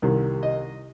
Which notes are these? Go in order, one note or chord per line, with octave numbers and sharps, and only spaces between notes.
C2 C3 D#3
D#5